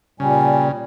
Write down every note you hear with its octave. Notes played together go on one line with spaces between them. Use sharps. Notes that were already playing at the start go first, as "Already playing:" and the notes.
A#2 C#3 G3 G#5